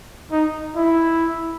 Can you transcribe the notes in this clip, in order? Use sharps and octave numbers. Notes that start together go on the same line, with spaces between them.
D#4
E4